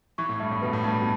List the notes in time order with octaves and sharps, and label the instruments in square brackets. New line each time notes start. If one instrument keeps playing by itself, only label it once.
[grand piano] E3 [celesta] C#6
[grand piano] A2
[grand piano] G2 [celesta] E5
[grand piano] A2
[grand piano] B2 [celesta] B4
[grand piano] A2
[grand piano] G2 [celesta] A5
[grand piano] A2
B2